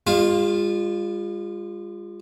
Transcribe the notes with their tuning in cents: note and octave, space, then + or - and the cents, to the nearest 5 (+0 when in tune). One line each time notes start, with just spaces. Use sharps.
G#3 -45 F4 +0